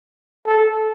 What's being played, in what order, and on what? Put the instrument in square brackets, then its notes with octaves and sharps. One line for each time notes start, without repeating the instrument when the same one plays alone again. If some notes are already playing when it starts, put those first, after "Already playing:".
[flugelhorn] A4